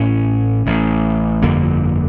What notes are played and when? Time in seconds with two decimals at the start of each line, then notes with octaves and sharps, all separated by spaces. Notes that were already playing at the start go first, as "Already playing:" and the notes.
Already playing: A1 A2 C#4
0.66 A1 A2
1.42 G1 F2 D3 A#3